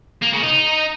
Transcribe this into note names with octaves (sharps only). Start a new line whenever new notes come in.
A#3
C#3
D#4